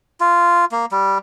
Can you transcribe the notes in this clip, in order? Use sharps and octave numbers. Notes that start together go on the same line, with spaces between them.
F4
A#3
G3